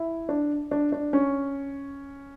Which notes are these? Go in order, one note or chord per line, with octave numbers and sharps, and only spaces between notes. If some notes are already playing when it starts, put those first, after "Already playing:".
Already playing: E4
D4
D4
D4
C#4